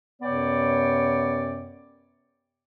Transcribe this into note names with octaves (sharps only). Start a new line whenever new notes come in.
F#2 C3 B3 C#5 D5 G5